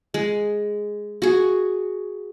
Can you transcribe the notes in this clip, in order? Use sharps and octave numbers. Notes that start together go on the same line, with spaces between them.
G#3
F#4 G#4